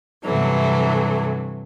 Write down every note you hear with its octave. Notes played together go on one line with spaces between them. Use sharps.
G2 C3 E3 F#3 A3